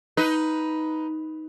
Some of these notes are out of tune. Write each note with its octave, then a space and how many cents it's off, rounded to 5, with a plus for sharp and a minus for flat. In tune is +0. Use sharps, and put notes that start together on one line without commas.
D#4 +10 B4 +0